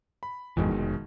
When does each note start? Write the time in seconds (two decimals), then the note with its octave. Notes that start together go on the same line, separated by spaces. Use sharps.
0.23 B5
0.57 G#1 F2 B2 D#3 E3 G#3
0.71 F1